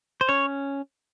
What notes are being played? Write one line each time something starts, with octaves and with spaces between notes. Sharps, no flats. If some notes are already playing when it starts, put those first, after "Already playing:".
C5
C#4 C#5